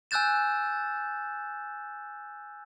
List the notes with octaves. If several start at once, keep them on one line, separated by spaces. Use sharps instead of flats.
G#5 E6 F#6 G6 A6 E7